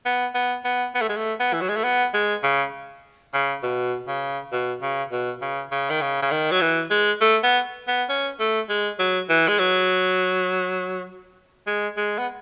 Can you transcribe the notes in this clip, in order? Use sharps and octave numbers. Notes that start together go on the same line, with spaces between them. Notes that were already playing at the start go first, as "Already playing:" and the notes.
B3
B3
B3
B3
A3
G#3
A3
B3
E3
F#3
G#3
A3
B3
G#3
C#3
C#3
B2
C#3
B2
C#3
B2
C#3
C#3
D#3
C#3
C#3
D#3
F#3
E3
G#3
A3
B3
B3
C#4
A3
G#3
F#3
E3
G#3
F#3
G#3
G#3
B3